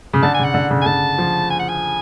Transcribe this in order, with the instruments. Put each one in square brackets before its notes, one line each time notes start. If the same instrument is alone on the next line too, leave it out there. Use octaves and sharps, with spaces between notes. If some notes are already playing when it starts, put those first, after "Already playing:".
[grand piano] C#3
[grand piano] D3 [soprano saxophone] A5
[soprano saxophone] G#5
[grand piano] C#3 [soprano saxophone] F#5
[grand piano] D3
C#3
[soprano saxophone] G#5
[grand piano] D3 [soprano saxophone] A5
[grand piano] F3
[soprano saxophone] G#5
F#5
G#5